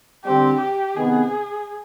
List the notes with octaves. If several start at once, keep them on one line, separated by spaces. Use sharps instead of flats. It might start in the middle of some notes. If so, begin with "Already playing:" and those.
D3 G3 C4 G4
G4
C3 D#3 B3 G#4